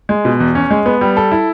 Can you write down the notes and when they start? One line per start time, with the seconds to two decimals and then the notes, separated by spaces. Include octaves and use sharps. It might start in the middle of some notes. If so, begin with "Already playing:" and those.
0.09 G#3
0.25 B2
0.40 E2
0.55 C#4
0.71 G#3
0.86 B3
1.01 G3
1.17 A4
1.31 E4